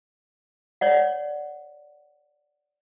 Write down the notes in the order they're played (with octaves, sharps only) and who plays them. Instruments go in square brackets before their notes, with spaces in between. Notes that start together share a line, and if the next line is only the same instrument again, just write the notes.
[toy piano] C#5 D5 F#5